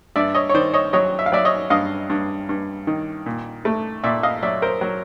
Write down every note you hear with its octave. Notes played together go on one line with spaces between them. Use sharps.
G2 D5 E5
C#5 D#5
C#5
D#3 C5 D5
C#5 D#5
F#3 C#5 D#5
E5
F5
F#3 D5 E5
C#5 D#5
G2 D#5 F5
G2
G2
D#3
A#2
A3
A#2 D5 E5
D#5 F5
F#3 D5 E5
A#4 C5
F#3